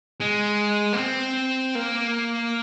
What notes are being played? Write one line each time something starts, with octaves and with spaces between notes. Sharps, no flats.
G#3
A#3
C4
A#3